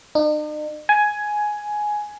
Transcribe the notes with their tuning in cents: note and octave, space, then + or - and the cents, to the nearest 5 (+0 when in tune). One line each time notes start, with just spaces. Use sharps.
D#4 -45
G#5 +10